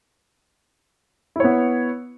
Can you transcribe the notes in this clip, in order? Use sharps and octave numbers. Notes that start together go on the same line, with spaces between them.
B3 E4 C#5